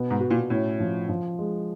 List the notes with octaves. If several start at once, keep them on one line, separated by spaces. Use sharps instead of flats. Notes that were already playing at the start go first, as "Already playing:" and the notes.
Already playing: B2 B3
G#2
F#4
A#2
A2 C#4
F3
F3
G#3